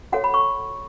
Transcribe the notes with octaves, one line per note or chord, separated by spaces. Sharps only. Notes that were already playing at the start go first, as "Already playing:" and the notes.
F#4 A4 C#5 F#5
B5
C#6